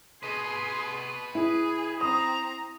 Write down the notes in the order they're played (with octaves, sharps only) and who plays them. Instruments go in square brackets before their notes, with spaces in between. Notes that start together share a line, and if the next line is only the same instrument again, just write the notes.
[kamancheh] G#4 C6 [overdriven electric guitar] B4 D#5
[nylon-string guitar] E4 [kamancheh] G#4
[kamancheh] C4 A#5 [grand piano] D#6